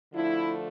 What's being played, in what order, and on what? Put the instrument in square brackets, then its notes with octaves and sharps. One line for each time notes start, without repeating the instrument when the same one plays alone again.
[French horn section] D3 F3 A3 E4